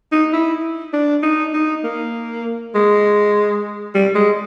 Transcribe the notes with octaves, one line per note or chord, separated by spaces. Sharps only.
D#4
E4
D4
D#4
D#4
A#3
G#3
G3
G#3